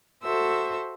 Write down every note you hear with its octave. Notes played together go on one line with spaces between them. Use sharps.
F#4 A4 C5 E5 E6